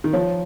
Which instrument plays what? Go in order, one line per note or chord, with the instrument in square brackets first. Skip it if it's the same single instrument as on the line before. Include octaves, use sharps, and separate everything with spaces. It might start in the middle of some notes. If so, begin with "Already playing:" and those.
[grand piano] D#3
[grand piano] F3 [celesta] C#5